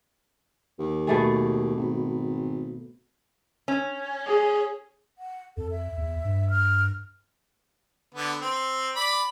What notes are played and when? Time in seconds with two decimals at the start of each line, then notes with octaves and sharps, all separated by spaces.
0.79 D#2
1.07 B2 A3 G#4
1.76 G#1
3.68 C#4
4.26 G#4
5.18 F#5
5.57 F2 A4
5.71 E5
5.97 E2
6.25 G2
6.50 F6
8.15 D3 B3
8.41 C4
8.96 D5 B5